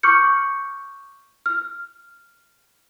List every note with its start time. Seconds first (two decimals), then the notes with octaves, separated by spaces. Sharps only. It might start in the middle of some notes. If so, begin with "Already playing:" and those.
0.03 C#6 D6 F6 G6 C#7
1.46 F6